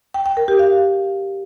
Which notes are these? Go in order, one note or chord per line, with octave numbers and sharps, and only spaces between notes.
G5
G5
A#4
G4
F5